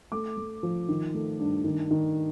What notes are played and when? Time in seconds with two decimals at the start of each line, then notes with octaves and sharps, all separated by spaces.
0.12 A3 D6
0.37 A3
0.63 F3
0.88 D#3
1.14 A3
1.39 G2
1.64 D#3
1.91 D#3